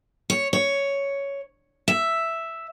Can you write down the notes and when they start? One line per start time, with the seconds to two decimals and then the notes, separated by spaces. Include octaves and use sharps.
0.30 C#5
0.53 C#5
1.88 E5